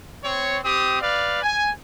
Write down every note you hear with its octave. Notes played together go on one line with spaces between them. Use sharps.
C4 C#5
C4 G4 D#6
B4 D5 F5
G#5